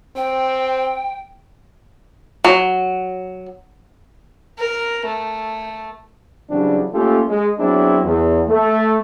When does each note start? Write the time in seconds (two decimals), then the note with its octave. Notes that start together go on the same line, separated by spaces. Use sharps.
0.16 C4 G5
2.45 F#3
4.59 A#4
5.06 A3
6.50 C#3 E3 F#3 G3 C4 D4
6.93 A3 A#3 C#4 F4 G4 A4
7.29 G#3
7.59 F#3 B3 C4 D4 E4 G#4
8.05 E2
8.49 A3